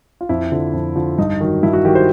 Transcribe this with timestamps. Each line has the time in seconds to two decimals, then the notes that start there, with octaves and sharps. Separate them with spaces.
0.21 F4
0.29 F2 E4
0.52 D3 F3
0.73 F2
0.96 D3 F3
1.18 G2 D#4
1.41 D#3 F#3
1.63 G2 E4
1.73 F#4
1.85 D#3 F#3 G4
1.95 C5